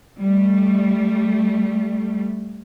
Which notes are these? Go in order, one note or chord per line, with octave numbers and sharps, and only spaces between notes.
G3 A3